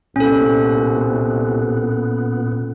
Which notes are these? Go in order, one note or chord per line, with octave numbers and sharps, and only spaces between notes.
C2 A#2 B3 C#4 A4